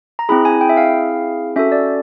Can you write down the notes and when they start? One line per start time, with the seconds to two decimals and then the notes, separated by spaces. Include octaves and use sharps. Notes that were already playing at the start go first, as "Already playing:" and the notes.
0.19 A#5
0.29 C4 E4 G#4 B5
0.45 G#5
0.61 G5
0.69 E5
0.77 F5
1.56 C#4 F#4 A4 E5
1.72 D5